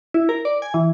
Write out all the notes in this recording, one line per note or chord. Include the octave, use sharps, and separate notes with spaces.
E4
A#4
D5
G#5
E3